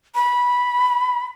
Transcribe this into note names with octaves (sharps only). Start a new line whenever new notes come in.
B5